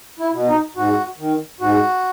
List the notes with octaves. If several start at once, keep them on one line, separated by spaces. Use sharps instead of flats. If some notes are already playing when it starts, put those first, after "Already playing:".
E4
B2
D#4
G#2 F#4
D#3
G#2 F#4